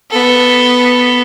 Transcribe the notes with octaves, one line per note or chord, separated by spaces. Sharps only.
B3 A4